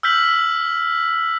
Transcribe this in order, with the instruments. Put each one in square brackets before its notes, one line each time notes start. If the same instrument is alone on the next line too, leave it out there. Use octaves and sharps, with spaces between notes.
[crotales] E6 F6 G6 B6 F#7